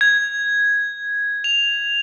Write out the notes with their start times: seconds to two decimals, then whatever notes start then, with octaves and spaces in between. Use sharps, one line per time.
0.01 G#6
1.44 F7